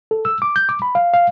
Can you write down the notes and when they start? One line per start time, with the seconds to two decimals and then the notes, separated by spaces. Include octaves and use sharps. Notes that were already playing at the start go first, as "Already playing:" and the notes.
0.11 A4
0.25 E6
0.42 D6
0.56 G6
0.69 D6
0.82 B5
0.95 F5
1.13 F5